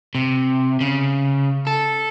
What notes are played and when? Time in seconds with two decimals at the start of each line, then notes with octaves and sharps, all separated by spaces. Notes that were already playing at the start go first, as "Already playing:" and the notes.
0.15 C3
0.81 C#3
1.67 A4